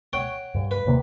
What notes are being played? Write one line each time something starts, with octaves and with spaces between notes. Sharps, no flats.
C#5 F#5 G5
G2
B4
D#1 C3 A#3